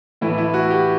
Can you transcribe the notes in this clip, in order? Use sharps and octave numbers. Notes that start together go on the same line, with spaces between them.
A2 E3 A3 E4
E4
F#4
G4